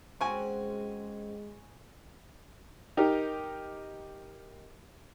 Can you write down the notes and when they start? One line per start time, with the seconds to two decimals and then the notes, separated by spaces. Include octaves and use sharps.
0.21 G#3 C4 C#4 F#4 G#5 C#6
2.97 D#4 G4 A#4